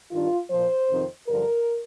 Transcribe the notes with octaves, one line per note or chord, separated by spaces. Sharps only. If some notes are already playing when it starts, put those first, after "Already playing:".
G2 D#3 F4
A#2 F3 C5
F2 C3 D#3
G2 D3 F3 A#4